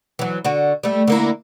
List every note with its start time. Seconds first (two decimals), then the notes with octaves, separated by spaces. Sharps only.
0.19 E3 F#3
0.44 D3 F#4
0.83 G3 A3
1.07 D3 A#3 E4